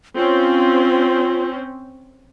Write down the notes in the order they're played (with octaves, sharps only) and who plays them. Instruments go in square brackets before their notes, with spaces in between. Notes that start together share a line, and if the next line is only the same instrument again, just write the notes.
[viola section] C4 C#4 [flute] F4